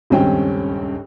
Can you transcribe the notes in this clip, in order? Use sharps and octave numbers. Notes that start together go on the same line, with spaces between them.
D#1 C#2 G2 C4 C#4 G5